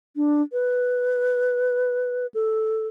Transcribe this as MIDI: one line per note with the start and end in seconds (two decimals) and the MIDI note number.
0.16 0.42 62
0.52 2.27 71
2.34 2.87 69